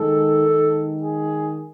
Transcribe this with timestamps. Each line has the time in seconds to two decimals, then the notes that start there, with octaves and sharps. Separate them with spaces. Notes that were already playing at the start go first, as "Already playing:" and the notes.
Already playing: D#3 G#3 A4
0.47 D#3 G#3
1.03 G#4